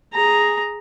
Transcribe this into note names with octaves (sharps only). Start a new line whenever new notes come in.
G#4 A#5